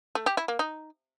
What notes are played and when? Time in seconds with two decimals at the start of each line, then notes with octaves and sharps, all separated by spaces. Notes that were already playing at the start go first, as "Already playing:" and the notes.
0.15 A3
0.26 G4
0.37 E4
0.48 A#3
0.59 D#4